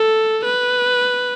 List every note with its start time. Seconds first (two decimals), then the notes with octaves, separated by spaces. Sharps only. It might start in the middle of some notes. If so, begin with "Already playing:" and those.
Already playing: A4
0.45 B4